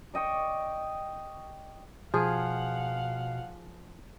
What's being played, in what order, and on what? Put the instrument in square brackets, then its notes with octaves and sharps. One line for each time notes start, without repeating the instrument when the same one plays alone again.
[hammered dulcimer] D5 D#5 G5 C#6
[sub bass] B2 [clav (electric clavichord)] F3 [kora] G#4 [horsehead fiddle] F5 F#5